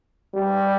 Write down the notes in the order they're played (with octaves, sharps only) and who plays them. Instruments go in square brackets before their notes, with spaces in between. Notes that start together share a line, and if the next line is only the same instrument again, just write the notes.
[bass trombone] G3